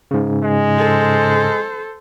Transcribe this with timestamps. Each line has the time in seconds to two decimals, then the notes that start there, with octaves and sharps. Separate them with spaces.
0.11 G#2 C#3
0.43 G#3
0.78 A4 C5